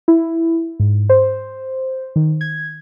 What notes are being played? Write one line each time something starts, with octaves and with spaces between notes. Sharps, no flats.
E4
G#2
C5
D#3
G#6